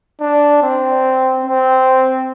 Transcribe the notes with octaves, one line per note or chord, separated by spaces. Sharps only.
D4
C4
C4